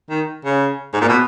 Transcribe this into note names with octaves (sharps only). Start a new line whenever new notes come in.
D#3
C#3
G#2
A#2
B2